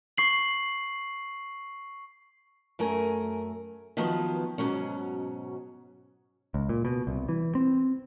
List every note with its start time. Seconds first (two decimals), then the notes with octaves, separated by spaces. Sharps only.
0.18 C#6 C7 F#7
2.79 F#2 A3 A#4 G#5
3.97 D#3 F3 F#3 B3
4.58 G#2 B2 F#3 C#4
6.54 C#2
6.69 A#2
6.85 B2
7.07 C2
7.29 E3
7.55 C4